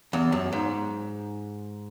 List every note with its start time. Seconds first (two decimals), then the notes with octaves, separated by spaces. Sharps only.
0.13 E2
0.32 F#2
0.53 G#2